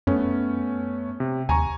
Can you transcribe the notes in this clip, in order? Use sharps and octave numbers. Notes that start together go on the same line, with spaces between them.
F#2 A3 B3 C#4
C3
D#2 G#5 A#5 C#6